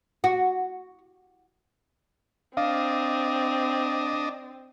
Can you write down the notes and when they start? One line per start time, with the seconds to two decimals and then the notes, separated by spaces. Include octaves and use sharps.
0.24 F#4
2.57 C4 D4 D#5 F5